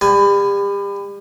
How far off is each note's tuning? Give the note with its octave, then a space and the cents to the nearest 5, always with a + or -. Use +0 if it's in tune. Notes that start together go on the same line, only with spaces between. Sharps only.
G3 +35 B4 +25 G#5 +5